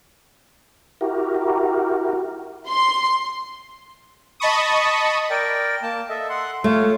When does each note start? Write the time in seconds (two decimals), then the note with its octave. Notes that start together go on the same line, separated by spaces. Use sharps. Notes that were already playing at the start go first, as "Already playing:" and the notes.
1.01 E4 F#4 G4 A#4
2.68 C6
4.40 D#5 A5 B5 C#6 D#6
5.30 A#4 D5 G5
5.83 A#3 A5
6.09 A4 D#5 E5
6.29 F#5 C6
6.64 A3 F4 C#5